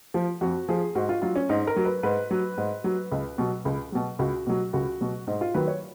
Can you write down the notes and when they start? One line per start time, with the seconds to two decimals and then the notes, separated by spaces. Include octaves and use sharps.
0.14 F3
0.41 F2 F#4
0.69 F3 G#4
0.95 G#2 F#4
1.09 F4
1.22 F#3 F4
1.36 C#4
1.49 G#2 D#4
1.67 A#4
1.76 F#3
1.85 B4
2.03 G#2 B4
2.31 F#3
2.57 G#2
2.84 F#3
3.12 C#2
3.38 B2 F#3
3.65 C#2
3.92 B2 F#3
4.19 C#2 F#4
4.47 B2 F#3
4.73 C#2 F#4
5.01 B2 F#3
5.27 G#2 D#4
5.41 F4
5.54 D#3 F#3 B4
5.67 C#5